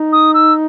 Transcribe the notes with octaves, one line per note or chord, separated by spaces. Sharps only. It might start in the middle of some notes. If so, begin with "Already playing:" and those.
Already playing: D#4
D#6
E6